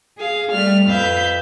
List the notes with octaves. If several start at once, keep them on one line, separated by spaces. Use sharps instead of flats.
G#4 F5
G3 A3 F6
F2 B4 E5 F5 G6